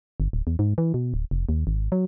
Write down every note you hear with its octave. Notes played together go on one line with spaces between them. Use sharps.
G1
D1
E2
G#2
E3
B2
D1
F1
D#2
G#1
F#3